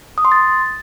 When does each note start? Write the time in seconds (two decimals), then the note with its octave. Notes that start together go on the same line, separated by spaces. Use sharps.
0.18 D#6
0.25 C6
0.32 A6